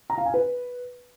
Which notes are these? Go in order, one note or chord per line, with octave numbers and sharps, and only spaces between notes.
A#5
F5
G#5
B4